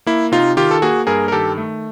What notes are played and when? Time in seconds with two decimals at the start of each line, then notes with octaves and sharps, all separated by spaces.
0.06 A#3 E4
0.32 C3 D#4 F4
0.57 D#3 F4 G4
0.71 A4
0.82 A#3 F#4 G#4
1.07 G2 G#4 A#4
1.28 A#4
1.32 D#3 G4 A4
1.57 A3